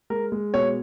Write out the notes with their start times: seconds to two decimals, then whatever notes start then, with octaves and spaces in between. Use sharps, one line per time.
0.10 G#3 A#4
0.32 G#3
0.54 B2 C#5